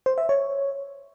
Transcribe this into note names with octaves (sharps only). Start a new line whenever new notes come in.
C5
E5
C#5